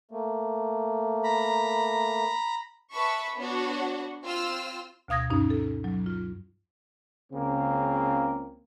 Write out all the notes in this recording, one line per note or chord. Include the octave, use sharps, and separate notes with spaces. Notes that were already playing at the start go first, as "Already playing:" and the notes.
A3 A#3
A#5 B5
B4 E5 A5 B5 C#6
B3 D4 F#4 C#5 F#5
C4 F4 C5 E6 F6
D2 B2 F5 D#6 G#6 A#6
G2 C#4 D#4
A4
F#3
F4
C#2 C#3 A#3 C4